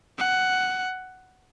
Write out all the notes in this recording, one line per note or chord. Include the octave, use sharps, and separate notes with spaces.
F#5